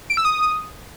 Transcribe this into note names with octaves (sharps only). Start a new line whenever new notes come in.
D7
E6
D#6